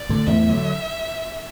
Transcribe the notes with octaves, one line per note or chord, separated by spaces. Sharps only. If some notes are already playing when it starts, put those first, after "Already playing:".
Already playing: D5
A2 D3
E2 A2 E5
D3 F#3